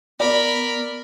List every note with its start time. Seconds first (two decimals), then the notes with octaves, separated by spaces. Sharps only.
0.20 B3 A#4 D5 B5